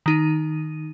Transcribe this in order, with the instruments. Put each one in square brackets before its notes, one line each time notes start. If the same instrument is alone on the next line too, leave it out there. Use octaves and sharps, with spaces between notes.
[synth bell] D#3 D#4 D#7